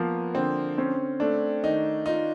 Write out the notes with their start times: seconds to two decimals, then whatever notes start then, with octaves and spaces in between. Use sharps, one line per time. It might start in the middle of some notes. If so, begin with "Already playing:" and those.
Already playing: F3 A#3 B3
0.35 D3 C4
0.78 C4 C#4
1.20 A3 D4
1.63 D#3 D#4
2.06 D#4 F4